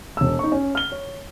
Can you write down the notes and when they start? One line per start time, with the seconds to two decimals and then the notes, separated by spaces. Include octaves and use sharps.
0.17 E1 E6
0.39 D#4 C#6
0.52 C#4
0.75 F6 G7
0.92 C#5